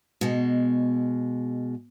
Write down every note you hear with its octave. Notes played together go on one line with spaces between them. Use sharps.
B2 G#3